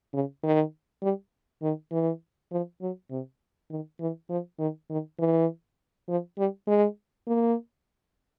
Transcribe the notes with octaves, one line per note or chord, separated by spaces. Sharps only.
C#3
D#3
G3
D#3
E3
F3
F#3
C3
D#3
E3
F3
D#3
D#3
E3
F3
G3
G#3
A#3